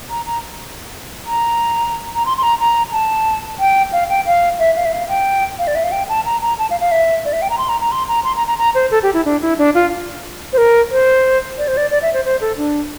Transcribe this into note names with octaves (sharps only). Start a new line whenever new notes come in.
A#5
A#5
A#5
A#5
C6
C6
A#5
A#5
A5
G5
F5
G5
F5
E5
F5
E5
F5
G5
F5
D5
E5
F5
G5
A5
A#5
A#5
A5
F5
F5
E5
D5
E5
G5
A#5
C6
A#5
A#5
C6
A#5
C6
A#5
A#5
A#5
C5
A4
G4
E4
D4
E4
D4
F4
C5
A#4
C5
D5
C5
D5
D5
E5
C5
C5
A4
D4